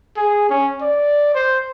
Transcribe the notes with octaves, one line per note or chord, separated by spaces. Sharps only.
G#4
C#4
D5
C5